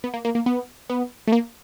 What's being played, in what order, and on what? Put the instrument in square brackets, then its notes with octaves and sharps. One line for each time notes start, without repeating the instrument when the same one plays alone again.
[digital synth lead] B3
A#3
A#3
A#3
B3
B3
A3
A#3